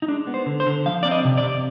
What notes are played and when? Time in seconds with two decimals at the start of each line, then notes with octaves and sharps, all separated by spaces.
0.02 D#4
0.08 G#3 D4
0.27 B3
0.34 C5
0.46 D3
0.60 C5
0.66 D3
0.86 F3 F5
1.03 C4 D5
1.11 D#5
1.25 C3
1.37 D5
1.43 C3